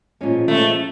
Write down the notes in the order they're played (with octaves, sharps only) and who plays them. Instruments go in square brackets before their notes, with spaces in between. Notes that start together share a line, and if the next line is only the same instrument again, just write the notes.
[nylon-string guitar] A#2 F3 G#3 C#4
[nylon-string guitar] A#2 F3 G#3 C#4 [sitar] A3